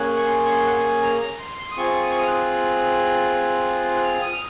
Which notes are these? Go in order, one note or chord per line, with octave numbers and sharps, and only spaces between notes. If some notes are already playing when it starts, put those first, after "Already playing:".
Already playing: A#3 C#4 G#4 F#6
C#6
C6
C#6
C6
F#5
G#5
A#5
A#5
C6
C6
D#6
C4 F4 G#4 C#6
D#6
C#6
D#6
F6
F#6
F#6
F6
D#6
F6